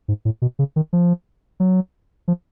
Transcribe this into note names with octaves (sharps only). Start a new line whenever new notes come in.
G#2
A2
B2
C#3
D#3
F3
F#3
F3